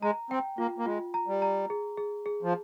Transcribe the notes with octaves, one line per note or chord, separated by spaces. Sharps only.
G#3 A#5
C4 G5
A#3 F4
A#3
G#3 F4
A#5
G3
A#5
G#4
G#4
G#4
F3